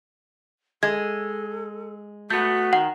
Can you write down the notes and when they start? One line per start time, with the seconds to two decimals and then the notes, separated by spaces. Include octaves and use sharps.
0.83 G#3 A4 G#6
2.30 A3 B3 F#4 G6
2.73 D#3 F#5